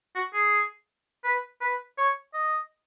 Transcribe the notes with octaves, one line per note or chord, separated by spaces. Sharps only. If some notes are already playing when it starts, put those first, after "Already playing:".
F#4
G#4
B4
B4
C#5
D#5